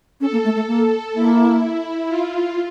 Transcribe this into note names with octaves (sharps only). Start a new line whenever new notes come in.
C#4 A4
A#3
A3
A3
A#3 A4
A#3 E4
F4